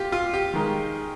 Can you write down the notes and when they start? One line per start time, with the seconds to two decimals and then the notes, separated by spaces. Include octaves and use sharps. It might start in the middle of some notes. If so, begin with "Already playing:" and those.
Already playing: F4 G4
0.12 F4
0.34 G4
0.53 D#3 G#3 D#4